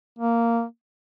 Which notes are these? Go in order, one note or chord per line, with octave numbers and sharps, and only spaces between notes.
A#3